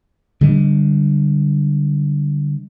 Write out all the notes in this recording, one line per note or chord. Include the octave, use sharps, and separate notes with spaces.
D3 G3 G#3